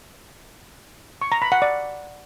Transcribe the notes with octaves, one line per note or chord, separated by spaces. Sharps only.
C#6
A#5
B5
F#5
D5